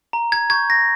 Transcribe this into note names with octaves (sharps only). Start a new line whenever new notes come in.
A#5
G#6
C#6 G6 G#6
A#6